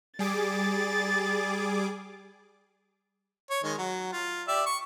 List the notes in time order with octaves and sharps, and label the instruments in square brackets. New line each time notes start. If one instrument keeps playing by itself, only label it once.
[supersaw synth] G3 G#4 D6 [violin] A6
[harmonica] C#5
D#3 G#3
F#3
F4
G4 D5 E5
C#6